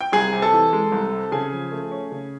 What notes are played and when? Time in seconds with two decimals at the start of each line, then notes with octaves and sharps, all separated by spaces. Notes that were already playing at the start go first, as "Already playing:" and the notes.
0.01 G5
0.12 C2 G#4 G#5
0.33 C3
0.42 A4 A5
0.53 E3
0.73 G#3
0.92 C2
1.12 C3
1.32 C#3 G#4 G#5
1.52 F3
1.72 A3
1.91 C#4
2.12 C#3